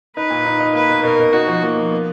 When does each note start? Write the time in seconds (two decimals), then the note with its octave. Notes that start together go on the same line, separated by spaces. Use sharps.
0.16 D#4 B4
0.30 A#2
0.46 D#4
0.60 D#4
0.75 A#3 B4
0.90 B2
1.03 B2 A#4
1.19 B2
1.33 D#4 F#4
1.47 F3
1.62 F3 A#3
1.77 F3
1.91 B3